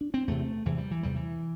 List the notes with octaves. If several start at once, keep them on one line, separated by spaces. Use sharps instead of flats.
D4
C4
E2 C3 A3
E2 C3 E3
G3
E3
E2 C3 G3
E3